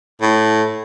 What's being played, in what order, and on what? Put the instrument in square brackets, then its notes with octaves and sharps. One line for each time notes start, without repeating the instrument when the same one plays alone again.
[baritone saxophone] A2